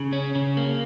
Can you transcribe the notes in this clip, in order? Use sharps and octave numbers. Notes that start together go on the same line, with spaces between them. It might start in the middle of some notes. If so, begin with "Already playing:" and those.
Already playing: C#3
C#4
C#3
A#3